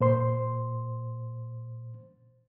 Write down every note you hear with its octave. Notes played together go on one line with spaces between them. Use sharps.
A#2 C5 C6